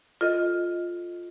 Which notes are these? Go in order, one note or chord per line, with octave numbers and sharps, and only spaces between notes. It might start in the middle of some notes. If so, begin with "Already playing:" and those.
F4 A4 D#5